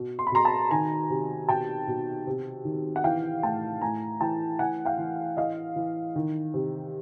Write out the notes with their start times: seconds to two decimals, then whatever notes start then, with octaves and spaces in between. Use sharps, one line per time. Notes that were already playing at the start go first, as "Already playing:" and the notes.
Already playing: B2
0.19 C6
0.27 B5
0.32 B2 A#5 C6
0.45 A5 B5
0.71 D#3 G#5 A#5
1.10 C3
1.49 B2 G5 A5
1.87 B2
2.27 C3
2.65 D#3
2.96 F#5
3.04 E3 F5 G5
3.43 A2 G5 A5
3.82 A2 G#5 A#5
4.21 E3 G5 A5
4.59 E3 F#5 G#5
4.85 F5 G5
4.99 E3
5.37 E3 D#5 F5
5.76 E3
6.16 D#3
6.54 C3